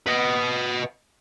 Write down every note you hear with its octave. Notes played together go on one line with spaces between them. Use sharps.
B4 D#5